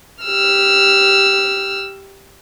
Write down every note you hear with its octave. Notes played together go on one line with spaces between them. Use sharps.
G4 E6 F6